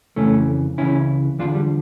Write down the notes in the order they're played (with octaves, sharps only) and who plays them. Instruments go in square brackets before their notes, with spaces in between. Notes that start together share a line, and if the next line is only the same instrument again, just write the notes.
[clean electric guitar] F2 C#3 E3 A3 C#4
C#2 C#3 E3 C#4 E4
E2 D3 F3 D4 F4
G3